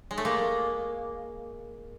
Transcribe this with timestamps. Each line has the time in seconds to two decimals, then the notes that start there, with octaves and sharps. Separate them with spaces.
0.11 G#3
0.18 A3
0.25 G#3 A#3